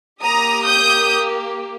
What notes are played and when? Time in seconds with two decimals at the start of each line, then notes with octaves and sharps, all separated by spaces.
0.22 A#3 G4 A#5 D#6
0.65 D#6 G6